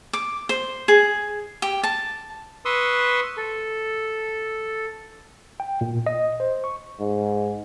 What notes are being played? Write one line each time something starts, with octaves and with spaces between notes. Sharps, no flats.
D6
C5
G#4
G4
A5
B4 C6 C#6 D#6 E6
A4
G5
A#2
D#5
C5
C#6
G#2